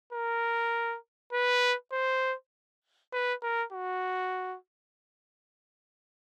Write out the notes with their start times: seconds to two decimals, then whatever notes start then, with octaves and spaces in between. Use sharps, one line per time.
0.13 A#4
1.33 B4
1.92 C5
3.13 B4
3.43 A#4
3.73 F#4